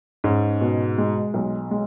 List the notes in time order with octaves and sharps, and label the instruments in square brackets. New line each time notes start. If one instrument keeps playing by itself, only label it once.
[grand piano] G#2 [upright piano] C#4
[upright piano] B2
G#3
B1
G#3